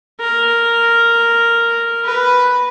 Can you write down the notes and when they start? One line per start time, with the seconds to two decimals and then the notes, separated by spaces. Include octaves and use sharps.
0.21 A#4
2.04 B4